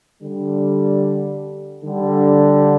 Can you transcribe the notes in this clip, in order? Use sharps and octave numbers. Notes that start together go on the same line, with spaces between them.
D3 G3
D3 G3